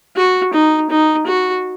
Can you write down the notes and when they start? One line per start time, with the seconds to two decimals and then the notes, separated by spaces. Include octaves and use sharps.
0.16 F#4
0.53 D#4
0.90 D#4
1.27 F#4